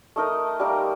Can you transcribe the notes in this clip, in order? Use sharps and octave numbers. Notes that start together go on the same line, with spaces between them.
A3 D#4 A#4 D#5
G3 A#3 D#4 A#4